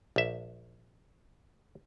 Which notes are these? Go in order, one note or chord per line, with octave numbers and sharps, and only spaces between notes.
A#1 E5